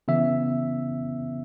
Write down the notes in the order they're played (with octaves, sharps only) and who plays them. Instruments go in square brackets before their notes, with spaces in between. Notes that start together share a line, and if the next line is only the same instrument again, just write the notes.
[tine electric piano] C#3 E3 B3 E5